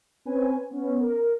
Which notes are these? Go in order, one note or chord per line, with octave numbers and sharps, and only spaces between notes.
C4 C#4 B4 G#5
B3 C#4
A#4